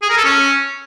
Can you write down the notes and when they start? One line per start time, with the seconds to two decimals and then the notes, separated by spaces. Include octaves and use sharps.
0.02 G#4
0.10 A#4
0.17 A4
0.24 C#4